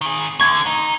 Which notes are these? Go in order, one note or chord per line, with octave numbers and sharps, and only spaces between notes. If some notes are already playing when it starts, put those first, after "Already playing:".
D#3 G#4
D2 D3 C#6 G#6
D#4